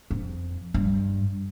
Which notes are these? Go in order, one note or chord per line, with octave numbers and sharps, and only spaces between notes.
F2
G2